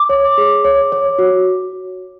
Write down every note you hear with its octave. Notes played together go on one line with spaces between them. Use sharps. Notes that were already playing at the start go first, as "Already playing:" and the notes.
Already playing: D6
C#5
G#4
C#5
C#5
F#4